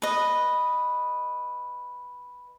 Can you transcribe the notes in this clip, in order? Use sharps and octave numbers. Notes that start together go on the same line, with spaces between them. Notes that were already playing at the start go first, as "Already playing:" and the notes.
B4 D#5